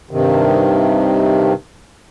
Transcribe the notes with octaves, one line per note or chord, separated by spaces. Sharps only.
G2 C3 D#3